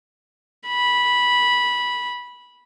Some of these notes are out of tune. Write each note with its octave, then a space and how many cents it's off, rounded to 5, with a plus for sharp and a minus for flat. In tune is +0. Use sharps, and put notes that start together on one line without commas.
B5 -10